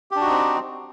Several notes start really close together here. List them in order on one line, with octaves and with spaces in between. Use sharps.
G4 D4 F#4 D#4 C4